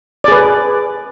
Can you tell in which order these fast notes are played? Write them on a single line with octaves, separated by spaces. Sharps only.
D5 G#4 B4